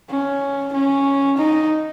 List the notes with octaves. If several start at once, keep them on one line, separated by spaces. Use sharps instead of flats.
C#4
C#4
D#4